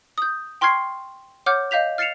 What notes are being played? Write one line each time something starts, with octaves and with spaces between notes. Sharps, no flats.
D#6 G6
G5 C6 C#6 F6 G#6 C7
C#5 F#5 D6 F6 G6
D#5 F5 G6 B6 F7
F6 A6 C7 C#7 E7 F7